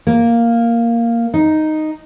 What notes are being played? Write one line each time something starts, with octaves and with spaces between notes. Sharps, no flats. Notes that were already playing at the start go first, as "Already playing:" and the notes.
A#3
D#4